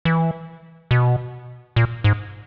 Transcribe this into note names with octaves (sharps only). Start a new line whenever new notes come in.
E3
B2
A#2
G#2